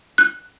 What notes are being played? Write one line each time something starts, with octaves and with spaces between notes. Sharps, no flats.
F#6